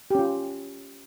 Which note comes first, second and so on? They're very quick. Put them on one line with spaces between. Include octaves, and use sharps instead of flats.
G4 C#4 F4